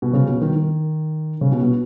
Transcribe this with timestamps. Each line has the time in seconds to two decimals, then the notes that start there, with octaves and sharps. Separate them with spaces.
0.02 B2
0.13 C#3
0.28 B2
0.41 D#3
0.56 D#3
1.41 C#3
1.52 B2
1.62 B2